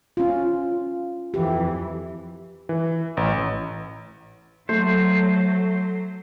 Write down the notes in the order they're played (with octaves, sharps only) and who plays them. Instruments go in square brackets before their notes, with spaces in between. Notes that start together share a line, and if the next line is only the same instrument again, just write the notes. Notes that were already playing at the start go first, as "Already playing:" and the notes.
[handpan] C#4 F4
[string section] F2 E3 [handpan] G4
[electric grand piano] E3
A1
[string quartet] F#3 [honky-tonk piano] A3 [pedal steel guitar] C5